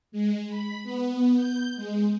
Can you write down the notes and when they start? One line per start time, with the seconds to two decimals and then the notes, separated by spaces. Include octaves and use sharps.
0.12 G#3
0.49 B5
0.84 B3
1.35 G6
1.76 G#3